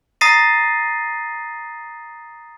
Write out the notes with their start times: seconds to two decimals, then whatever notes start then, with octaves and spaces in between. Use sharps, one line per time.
0.21 A#5 D#6 A6 A#6 C7 D#7